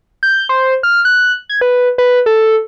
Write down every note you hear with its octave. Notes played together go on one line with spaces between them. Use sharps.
G6
C5
F6
F#6
G#6
B4
B4
A4